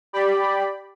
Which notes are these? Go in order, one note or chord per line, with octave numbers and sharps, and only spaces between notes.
G4 D5 B5